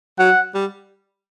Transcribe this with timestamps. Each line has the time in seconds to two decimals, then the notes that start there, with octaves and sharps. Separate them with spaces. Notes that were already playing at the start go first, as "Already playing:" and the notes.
0.19 F#3 F#5
0.55 G3